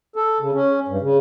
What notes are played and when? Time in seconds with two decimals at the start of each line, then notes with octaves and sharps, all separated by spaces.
0.16 A4
0.40 C#3
0.54 C#4
0.88 G2
1.01 C#3